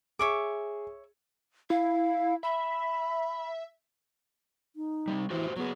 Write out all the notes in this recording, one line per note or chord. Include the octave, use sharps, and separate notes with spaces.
G#4 C#5 E5 D6
E4 F5
E5 B5
D#4
G3 A#3 C4
E3 F#4 G4 C5
F#3 B3 G#4